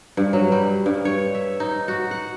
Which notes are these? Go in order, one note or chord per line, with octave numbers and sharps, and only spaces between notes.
G2
F#3
G3
G2
C#5
E5
D#4
F#4
F#5